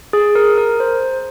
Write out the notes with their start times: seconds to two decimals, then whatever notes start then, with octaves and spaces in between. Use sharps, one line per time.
0.13 G#4
0.35 A#4
0.58 A#4
0.80 C5